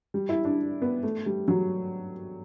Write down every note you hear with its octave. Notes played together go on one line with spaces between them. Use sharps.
G3
E4
D4
B3
A3
G3
F#3